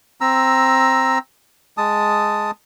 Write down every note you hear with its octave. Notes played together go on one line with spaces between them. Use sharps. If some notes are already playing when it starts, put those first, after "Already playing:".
C4 A#5 E6
G#3 A5 D#6